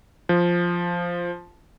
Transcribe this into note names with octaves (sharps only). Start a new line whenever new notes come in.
F3